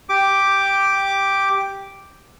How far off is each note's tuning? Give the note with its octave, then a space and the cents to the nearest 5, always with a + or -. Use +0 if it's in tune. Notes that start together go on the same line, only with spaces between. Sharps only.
G4 +0 D6 +0